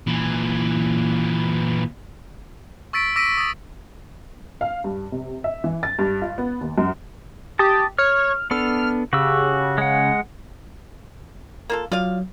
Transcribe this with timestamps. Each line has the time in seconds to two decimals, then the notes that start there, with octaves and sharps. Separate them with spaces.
0.07 A#2 E3
2.93 C#6 E6 A6 B6 D7
3.16 D6 E6 A#6 B6 D7 D#7
3.37 D#6 A6
4.61 F5
4.84 G2
5.12 C3
5.44 E5
5.64 E3
5.83 A6
5.99 G2
6.22 F4
6.38 B3
6.61 D#2
6.78 F#2
7.59 G4 A5 D#6
7.98 C#5 F6
8.51 B3 D4 A4 F6
9.13 C#3 F#4 G4 E6
9.78 G#3 F#5
11.70 A#3 F4 A4
11.92 F#3 F4 D5 F5